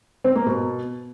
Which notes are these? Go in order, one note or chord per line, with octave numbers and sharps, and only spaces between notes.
C4
A#3
B2